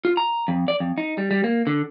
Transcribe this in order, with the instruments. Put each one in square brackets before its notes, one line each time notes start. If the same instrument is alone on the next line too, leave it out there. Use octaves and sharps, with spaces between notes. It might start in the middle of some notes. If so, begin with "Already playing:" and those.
[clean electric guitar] F4
A#5
F2
D5
F2
D#4
G3
G3
A#3
D3